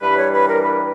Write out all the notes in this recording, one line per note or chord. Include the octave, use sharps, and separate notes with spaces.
G2 E3 G3 B4
C#5
B4
A#4
B4